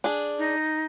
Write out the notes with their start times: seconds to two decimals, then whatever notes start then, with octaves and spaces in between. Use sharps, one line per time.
0.04 D4 G#4
0.39 D#4